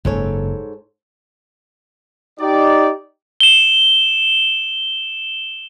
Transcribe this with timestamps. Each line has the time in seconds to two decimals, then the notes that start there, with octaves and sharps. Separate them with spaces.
0.05 F#1 G#2 A4 C#5
2.40 D#4 G4 D5
3.40 E7 G7